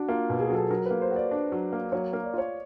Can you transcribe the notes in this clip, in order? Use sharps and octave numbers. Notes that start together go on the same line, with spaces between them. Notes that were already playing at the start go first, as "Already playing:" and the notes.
Already playing: D4 F#4
A#3 F4
B2
G#4
F#3 A4
F#3 A#4
A#3 B4
C5
F#4
D5
D4
F#3
A#3
F#3 C#5
A#3
D5
F4 C#5